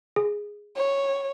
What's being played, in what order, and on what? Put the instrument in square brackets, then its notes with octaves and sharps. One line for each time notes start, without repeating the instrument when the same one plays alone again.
[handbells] G#4
[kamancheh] C#5